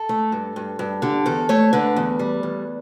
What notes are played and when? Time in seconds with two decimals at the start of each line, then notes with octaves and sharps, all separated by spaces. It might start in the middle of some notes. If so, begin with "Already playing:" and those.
Already playing: A4
0.09 A3
0.32 G2
0.56 G2
0.79 G2
1.02 D3 G4
1.26 E2 A4
1.49 A3 C#5
1.73 D3 B4
1.97 E2
2.19 G3
2.43 E2